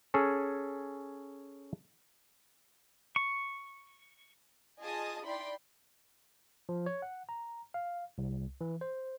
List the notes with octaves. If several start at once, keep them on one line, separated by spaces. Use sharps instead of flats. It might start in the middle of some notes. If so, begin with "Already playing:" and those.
C#4 G#4 A4
C#6
F4 G#4 D#5 G#5 A5 D#6
D#4 E4 D5 G5 B5 C6
F3
C#5
F#5
A#5
F5
C2
E3
C5